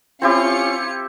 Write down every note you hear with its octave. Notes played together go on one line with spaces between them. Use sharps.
C4 C#4 E4 F4 G4 C#7